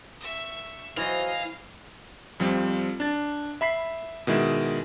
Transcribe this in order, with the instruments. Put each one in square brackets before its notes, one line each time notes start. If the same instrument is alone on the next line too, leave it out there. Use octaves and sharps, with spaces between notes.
[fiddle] E5 C#6
[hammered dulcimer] E3 [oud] F#3 C5 [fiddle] D#5 [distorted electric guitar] F5
[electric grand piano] F2 F3 G3 C4
D4 A6
E5 B5 B6 C7
B2 D#3 G#3 E4